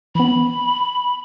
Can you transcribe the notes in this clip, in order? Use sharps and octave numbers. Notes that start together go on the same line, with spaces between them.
E3 B3 B5